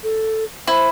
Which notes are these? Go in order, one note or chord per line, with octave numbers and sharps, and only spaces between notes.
A4
E4 C5